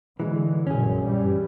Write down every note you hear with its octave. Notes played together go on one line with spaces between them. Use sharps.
D3 E3 G#3
A#1 F#2 C#4 G#4
G2 E3 G3